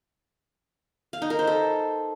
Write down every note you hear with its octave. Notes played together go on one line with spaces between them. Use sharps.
F5
D#4
A#4
C5
A4